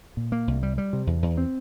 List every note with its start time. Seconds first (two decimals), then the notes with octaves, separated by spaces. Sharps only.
0.17 A#2
0.32 A#3
0.48 C2
0.63 G3
0.78 G3
0.93 C3
1.07 E2
1.23 E2
1.38 C4